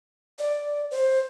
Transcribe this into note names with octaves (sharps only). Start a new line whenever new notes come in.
D5
C5